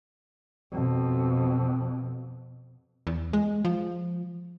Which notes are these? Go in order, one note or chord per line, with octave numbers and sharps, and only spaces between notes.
F2 B2
E2
G#3
F3